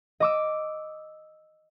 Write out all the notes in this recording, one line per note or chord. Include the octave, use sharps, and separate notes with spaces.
D#5 D6 E6